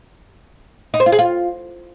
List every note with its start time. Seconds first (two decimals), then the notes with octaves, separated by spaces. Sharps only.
0.94 D#4
1.00 C5
1.06 F4
1.12 G#4
1.19 F4